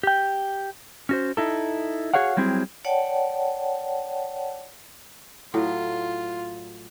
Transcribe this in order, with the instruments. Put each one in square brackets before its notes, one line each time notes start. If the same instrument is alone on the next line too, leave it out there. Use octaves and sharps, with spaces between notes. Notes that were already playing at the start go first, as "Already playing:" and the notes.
[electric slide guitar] G4 G5
C#4 F#4 C5
D#4 E4 A4
F#4 G#4 C#5 F5 F#5
F#3 G3 C4 E4 G#4
[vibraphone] C#5 D5 F#5 G5 A5
[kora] A2 F#3 [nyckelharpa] F4